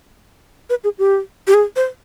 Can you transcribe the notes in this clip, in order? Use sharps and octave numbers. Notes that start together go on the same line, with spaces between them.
B4
G#4
G4
G4
G#4
C5